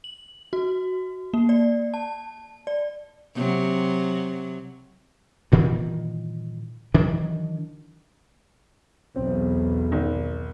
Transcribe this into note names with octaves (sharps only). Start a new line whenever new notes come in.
F#7
F#4
A#3
D5
A5
D5
C3 F#3
G2 A#2 D#3 E3
D#3 E3 F#3 D4
B1 E2 C4
G#1